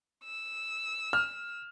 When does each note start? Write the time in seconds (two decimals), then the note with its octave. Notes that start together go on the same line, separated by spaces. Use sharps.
0.24 E6
1.13 F6